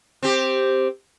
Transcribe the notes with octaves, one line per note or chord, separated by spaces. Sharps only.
C4 G4